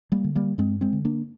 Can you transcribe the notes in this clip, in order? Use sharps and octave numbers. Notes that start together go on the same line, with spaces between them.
G3 A#3
D3
G3 A#3
G2 G#3 C4
G#3 C4
D3
A#3 D4